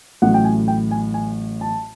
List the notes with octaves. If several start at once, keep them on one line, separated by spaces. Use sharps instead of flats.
A1 A2 F#3 F#5
G5
G#5
G5
G#5
G#5
A5